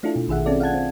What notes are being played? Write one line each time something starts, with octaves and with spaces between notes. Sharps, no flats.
A3 D4 E4 F4 A4
B2
A#1 D#3 G#4 E5 F#5
C4 C#4 F4 A4 D5
F5 F#5 A5 G#6
C4